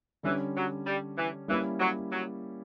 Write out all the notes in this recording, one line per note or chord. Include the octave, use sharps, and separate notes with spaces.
D3 E3 G3 C#4
F#3
G3
E3
E3 G3 A#3 C#4 E4
F#3
F#3